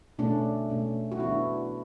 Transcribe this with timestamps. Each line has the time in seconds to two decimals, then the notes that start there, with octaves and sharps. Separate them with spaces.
0.19 B2 A3 C#4 D4
0.70 B2 A3 C#4
1.12 F#4
1.20 E3 B3 D4 E4